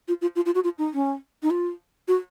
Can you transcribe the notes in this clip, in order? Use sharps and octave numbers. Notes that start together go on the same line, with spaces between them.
F4
F4
F4
F4
F#4
F4
D#4
C#4
D#4
F4
F#4